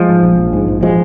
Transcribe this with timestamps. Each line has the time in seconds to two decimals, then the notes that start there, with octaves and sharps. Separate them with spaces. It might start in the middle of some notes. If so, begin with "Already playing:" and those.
Already playing: F3 G#3
0.09 G#2
0.23 A#1
0.39 A#1
0.53 G#2
0.68 A#1
0.83 F3 G#3